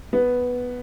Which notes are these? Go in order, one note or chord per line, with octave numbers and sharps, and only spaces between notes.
B3